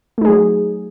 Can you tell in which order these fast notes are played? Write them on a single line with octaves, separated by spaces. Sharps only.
A3 D#4 G#4 F#3